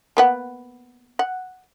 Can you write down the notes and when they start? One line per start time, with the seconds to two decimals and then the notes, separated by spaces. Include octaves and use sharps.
0.17 A#3 B3 F#5
1.19 F#5